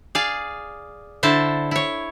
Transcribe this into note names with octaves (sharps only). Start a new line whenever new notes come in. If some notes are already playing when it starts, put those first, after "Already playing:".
G#4 D5 F5
D3 E4 C5 A5
E4 C#5